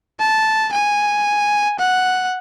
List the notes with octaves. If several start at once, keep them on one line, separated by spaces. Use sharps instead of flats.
A5
G#5
F#5